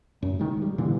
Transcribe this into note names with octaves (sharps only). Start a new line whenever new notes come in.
F#2
C2 D#3 G#3
G3
A#2 D3 E3